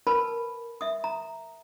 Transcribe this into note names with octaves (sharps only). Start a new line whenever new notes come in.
A#4 B4 A5 B5
E5 D#6
A#5